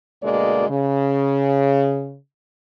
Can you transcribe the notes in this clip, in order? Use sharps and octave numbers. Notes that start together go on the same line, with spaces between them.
D2 B2 G#3 A#3 D5
C#3